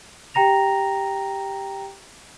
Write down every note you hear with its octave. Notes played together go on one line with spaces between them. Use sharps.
G4 G5 A#5 A#6 F7